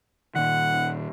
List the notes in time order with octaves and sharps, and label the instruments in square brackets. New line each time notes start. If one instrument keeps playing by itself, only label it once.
[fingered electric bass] A#2 D#3 [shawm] F#5